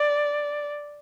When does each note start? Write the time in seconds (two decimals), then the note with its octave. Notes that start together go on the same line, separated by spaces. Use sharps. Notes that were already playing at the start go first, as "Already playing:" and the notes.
Already playing: D5